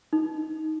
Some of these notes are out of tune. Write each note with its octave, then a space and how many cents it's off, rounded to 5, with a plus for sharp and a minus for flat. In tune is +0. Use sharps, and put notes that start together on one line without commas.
D#4 +10